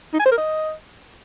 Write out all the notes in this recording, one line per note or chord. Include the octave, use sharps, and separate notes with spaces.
D#4
G#5
C5
A#4
D#5